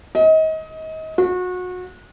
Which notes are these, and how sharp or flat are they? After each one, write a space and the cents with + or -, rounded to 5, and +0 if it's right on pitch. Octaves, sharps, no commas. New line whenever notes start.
D#5 +30
F#4 -30